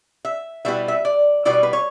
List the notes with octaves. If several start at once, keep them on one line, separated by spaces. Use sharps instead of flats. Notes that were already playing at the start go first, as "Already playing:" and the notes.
E5
B2 G3 B3 E4 E5
E5
D5
B2 G3 B3 E4 D5
B4
C#5